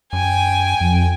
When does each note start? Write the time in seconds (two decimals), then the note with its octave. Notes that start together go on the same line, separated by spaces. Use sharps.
0.13 F#2 G5 G#5
0.81 F2